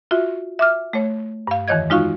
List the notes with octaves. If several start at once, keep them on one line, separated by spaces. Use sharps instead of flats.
F4 F#4 E5
E5 D6 F6
A3 C#5
G2 F5
F2 D#3 E3 C#5 D#5 G#6
G#3 D#4 F4 F#4 F5 C#6